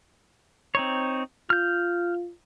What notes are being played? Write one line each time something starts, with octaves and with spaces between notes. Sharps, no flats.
C4 D#4 C#5
F4 F6 G6